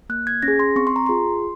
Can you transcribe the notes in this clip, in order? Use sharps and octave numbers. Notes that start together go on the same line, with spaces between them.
A#3 F#6
G#6
C#4 A#6
G#4
C6
C4 C#6
C6
A#5
F4 G#4 C6